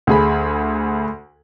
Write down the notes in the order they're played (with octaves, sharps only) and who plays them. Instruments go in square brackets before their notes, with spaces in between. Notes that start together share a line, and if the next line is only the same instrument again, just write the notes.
[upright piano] D2 G#4 B5